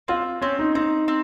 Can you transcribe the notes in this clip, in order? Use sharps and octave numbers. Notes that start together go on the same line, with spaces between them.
C4 F4
C4 C#4
D#4
C4 D#4
C4